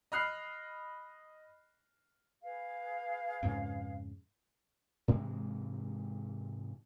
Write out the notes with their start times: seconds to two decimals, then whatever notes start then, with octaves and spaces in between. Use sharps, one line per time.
0.12 D#5 B5 F6 F#6 C7
2.42 G#4 B4 F5
3.43 F2 G#2 C#3
5.08 G#2 C3 E3 G#3